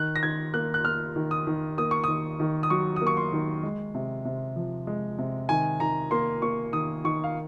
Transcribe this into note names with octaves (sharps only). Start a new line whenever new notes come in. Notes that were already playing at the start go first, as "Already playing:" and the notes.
Already playing: D#3 F#6
A#6
D#3 G#6
A#3 F#6
F#6
A#3 F6
D#3
D#6
D#3
A#3 D#6
C#6
D#3 D#6
D#3
D#6
F#3 C#6
D#6
A#3
C#6
C6
D#3
G#3
C3
C3
F3
G#3
C3
D#3 G#5
D#3 A#5
A#3 C6
A#3 C#6
D#3 D#6
D#3 C#6
F5